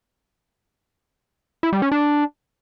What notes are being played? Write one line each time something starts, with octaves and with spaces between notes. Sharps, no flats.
E4
G3
C#4
D4